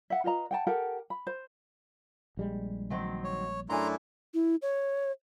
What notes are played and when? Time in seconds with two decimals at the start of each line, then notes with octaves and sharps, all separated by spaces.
0.10 E5 F#5
0.24 F4 B4 D#5 A#5
0.51 F#5 G5 A5
0.67 G4 A4 A#4 F#5
1.10 B5
1.27 C5
2.37 A#1 G3 G#3
2.90 D#3 F#3 C4
3.24 C#5
3.70 F#2 A3 D4 E4 G#5 A#5 C6
4.34 E4
4.62 C#5